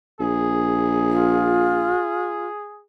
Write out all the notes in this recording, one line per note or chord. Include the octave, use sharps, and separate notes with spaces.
A#1 G#4
F4